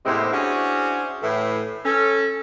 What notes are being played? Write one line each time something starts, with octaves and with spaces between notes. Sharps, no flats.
E2 A2 C3 G#3 A#3 C4
C#4 D4 E4 F#4 G#4 C5
A2 E3 A3
C#4 A4